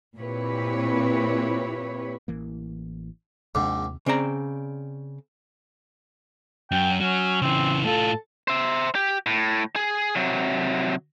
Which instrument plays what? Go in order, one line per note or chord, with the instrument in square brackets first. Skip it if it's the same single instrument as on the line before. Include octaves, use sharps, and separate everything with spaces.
[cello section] A#2 C4 E4 G4 B4 C#5
[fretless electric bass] A1 E3 A#3
[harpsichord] A#1 G#2 [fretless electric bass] D#2 C3 [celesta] D6
[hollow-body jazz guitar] C#3 C4 D5 A#5
[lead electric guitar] F#2 [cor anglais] G5
[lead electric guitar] F#3 [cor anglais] C#4
[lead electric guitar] C#3 E3 [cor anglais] C4
[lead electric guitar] A2 F4 [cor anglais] A4
[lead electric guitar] C5 E5
G4
A2
G#4
C3 F#3